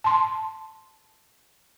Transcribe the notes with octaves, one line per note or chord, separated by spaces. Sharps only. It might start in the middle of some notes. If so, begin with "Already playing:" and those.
A5 C6